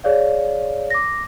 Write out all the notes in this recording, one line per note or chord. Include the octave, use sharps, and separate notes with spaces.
G#4 C#5 D5 F5
D6 A#6